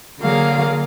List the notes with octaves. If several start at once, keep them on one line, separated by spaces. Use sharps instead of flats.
D3 F#3 A#3 G#4 F5